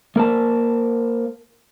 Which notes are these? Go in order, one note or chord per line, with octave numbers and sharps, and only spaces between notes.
A#3 A#4 C5 A5